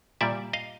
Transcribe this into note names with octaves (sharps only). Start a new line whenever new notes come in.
A#2 G3 D5 E5
D#5 F5